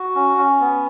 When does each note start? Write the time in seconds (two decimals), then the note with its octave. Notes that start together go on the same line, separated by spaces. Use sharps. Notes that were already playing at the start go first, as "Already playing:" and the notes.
Already playing: F#4
0.16 C#4
0.38 C#4
0.60 B3